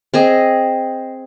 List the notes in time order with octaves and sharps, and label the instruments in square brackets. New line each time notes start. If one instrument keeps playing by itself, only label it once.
[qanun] C4 G#4 D#5